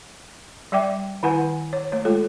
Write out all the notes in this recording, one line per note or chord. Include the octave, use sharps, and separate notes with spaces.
G3 D5 E5 G5 D6
D#3 E4 B4 F#5 G#5
C#5
A3 C#5
G#3 F4 A4